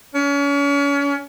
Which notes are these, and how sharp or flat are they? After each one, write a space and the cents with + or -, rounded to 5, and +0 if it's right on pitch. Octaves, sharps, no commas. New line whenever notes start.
C#4 +35